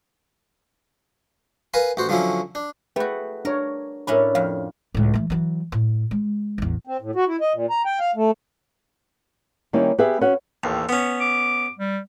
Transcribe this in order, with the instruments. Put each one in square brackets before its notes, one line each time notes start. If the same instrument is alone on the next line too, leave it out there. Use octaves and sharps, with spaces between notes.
[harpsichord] A#4 B4 F5 G#5
A1 F#4 C5
D3 F3 F#3 C#4 E4
D4
[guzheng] A3 F#4 [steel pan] G#4 B4 G5
[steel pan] D4 C#5 C#6 [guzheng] A#4
[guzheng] A2 C#4 D4 [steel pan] A#4 E5 B5
[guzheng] F2 [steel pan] F5
[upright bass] C#2 A2
E3 A3
E3 F#3
A2
G#3
A1 E2
[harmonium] C4
A2
F#4
E4
D#5
A#2
A#5
G5
F5
A3
[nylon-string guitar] D#3 G3 A#3 C#4 D#4 E4
B3 G4 G#4 B4 E5
C#4 F#4 B4 C#5 F#5
[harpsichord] A1 D#2
B3 C#4
[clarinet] D6
G3